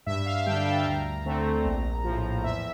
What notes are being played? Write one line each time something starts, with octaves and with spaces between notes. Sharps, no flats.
G2 E5
F5
D3 G3 D4 G5
A5
D2 A#5
D3 A3 C4
A#1
A2 F3
E2 E5